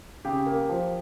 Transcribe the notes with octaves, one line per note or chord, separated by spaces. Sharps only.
C#3 G4
A#3
F3